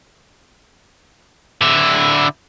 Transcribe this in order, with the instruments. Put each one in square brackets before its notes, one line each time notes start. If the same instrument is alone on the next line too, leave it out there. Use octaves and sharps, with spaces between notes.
[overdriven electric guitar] D3 E4